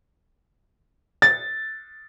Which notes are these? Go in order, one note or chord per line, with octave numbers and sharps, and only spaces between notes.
A6